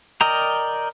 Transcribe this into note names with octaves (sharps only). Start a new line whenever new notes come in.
A#4 D5 D#5 G5 A#5